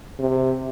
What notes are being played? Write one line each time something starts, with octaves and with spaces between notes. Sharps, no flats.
C3